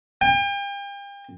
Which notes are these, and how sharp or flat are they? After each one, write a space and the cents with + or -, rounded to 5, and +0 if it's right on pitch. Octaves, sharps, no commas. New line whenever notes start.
G5 +40